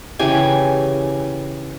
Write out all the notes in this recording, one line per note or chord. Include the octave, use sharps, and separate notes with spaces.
C#3 E3 G4 G#5